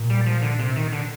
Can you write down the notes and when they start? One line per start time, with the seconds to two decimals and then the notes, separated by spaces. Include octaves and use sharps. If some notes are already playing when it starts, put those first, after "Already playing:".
Already playing: A#2
0.10 G3
0.26 F3
0.42 D3
0.59 C3
0.76 D#3
0.92 D3